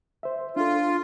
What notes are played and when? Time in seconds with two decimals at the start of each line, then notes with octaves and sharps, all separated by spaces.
0.23 C5 E5
0.56 D4 F4 A4